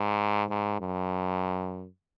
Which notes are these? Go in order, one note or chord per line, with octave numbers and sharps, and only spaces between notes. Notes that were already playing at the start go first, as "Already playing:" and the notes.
Already playing: G#2
G#2
F#2